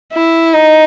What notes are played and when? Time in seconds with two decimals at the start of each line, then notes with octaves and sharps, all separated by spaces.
0.13 E4
0.54 D#4